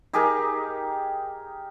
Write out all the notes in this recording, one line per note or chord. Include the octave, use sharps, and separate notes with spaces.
D#4 G4 G#4 A#4